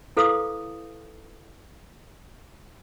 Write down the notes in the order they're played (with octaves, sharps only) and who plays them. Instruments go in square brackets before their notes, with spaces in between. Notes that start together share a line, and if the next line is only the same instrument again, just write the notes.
[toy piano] E4 A4 B4 F5 D6 D#6